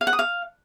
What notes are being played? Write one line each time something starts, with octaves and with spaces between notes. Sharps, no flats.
F5
F#5
D#6
F5